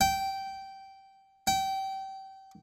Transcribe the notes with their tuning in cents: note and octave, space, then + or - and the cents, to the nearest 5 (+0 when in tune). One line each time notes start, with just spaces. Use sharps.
G5 -15
G5 -25